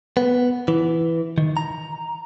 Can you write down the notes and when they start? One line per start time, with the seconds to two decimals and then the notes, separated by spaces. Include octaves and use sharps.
0.17 B3
0.68 E3
1.38 D#3
1.57 A#5